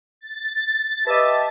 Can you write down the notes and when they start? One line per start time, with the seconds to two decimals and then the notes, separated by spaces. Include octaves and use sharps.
0.21 A6
1.07 G4 B4 D#5 E5 A5